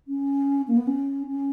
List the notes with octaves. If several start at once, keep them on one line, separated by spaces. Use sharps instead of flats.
C#4
A#3
B3
C#4
C#4